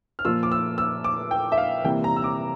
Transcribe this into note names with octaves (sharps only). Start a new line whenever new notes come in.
F6
A#2 F3 A#3 F4 E6
D6
E6
E6
D6
G5
E5
F5
C3 E3 G3 A#3 G5
A#5
E6
D6